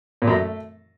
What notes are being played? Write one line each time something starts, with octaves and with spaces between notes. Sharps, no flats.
A#2
F#2
A3